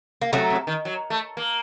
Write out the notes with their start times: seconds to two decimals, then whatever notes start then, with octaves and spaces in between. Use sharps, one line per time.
0.22 A#3
0.33 C3 F#3 A3
0.50 C3
0.67 D#3
0.85 F#3
1.10 A3
1.37 A#3